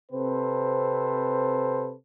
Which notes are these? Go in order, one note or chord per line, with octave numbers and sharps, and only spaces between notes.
C3 C4 A4 B4 C5